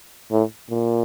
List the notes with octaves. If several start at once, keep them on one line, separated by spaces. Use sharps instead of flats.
A2
A#2